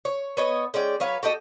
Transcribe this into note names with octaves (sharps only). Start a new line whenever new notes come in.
C#5
B3 C#5 D#5
G#3 C#4 D5 G5
F#3 B4 C#5 F5
F#4 G4 A4 D#5